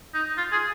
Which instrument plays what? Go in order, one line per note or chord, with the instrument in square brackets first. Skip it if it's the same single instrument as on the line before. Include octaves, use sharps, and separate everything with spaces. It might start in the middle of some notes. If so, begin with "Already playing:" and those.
[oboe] D#4
F4
G#4